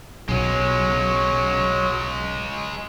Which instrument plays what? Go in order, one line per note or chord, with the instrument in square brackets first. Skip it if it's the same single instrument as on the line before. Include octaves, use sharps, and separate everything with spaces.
[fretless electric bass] B1 [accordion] F#3 [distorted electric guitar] G#3 C#4